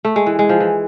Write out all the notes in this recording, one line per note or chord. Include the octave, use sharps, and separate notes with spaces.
A3
G#3
E3
G#3
F3
E3